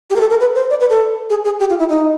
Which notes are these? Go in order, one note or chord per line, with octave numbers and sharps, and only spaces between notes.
G4
A#4
A4
A#4
B4
C5
D5
B4
A4
G#4
G#4
G4
F4
E4
D#4